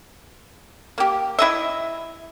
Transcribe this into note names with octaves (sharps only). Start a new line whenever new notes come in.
A#3 G4
E4 D#5 E5